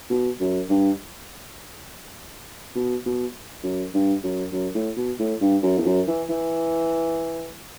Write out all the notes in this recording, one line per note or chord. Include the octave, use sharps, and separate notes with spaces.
B2
F#2
G2
B2
B2
F#2
G2
F#2
F#2
A2
B2
A2
G2
F#2
E2
F#2
E3
E3